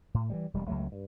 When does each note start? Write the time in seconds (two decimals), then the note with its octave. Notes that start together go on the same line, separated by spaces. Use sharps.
0.14 A2
0.30 E3 F#3 G3
0.54 E1 G3 G#3
0.67 C#2 F#3 A3
0.92 G2